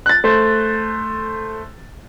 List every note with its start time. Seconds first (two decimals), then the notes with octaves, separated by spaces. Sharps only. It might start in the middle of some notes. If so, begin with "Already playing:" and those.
0.06 F#6 A6
0.24 A3 C5